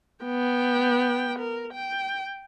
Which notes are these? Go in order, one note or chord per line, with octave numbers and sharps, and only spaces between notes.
B3 G5
A#4
G5